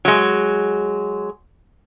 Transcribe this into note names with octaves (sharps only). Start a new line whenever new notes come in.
F#3 G#3